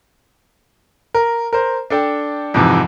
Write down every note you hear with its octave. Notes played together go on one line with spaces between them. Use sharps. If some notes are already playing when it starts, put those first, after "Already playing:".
A#4
A#4 C5
D4 A4 G5
F2 G#2 C3 E3